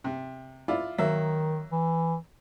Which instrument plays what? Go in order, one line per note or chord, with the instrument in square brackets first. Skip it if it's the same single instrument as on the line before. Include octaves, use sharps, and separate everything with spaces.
[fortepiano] C3
E4 F4 D5
[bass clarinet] D#3 [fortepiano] F#3 A#3 E5
[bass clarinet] E3